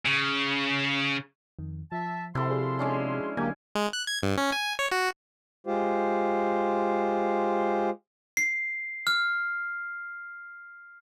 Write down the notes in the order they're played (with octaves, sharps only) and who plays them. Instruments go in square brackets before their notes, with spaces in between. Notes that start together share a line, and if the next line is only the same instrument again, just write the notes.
[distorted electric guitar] C#3
[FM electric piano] F2 D#3
[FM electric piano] F3 [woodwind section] E5 A5
[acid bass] C3 [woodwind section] F3 F5 C6 [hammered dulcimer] E4 A4
[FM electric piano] F#4 G#4 D5
[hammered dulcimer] G#3 C#4 D4
[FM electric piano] D3 F#3 D4 [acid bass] A#3 [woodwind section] G4 [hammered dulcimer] G#5
[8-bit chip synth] G#3
F#6
G#6
G2
C#4
G#5
C#5
F#4
[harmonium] G#3 F4 G4 C5
[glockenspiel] C7
F6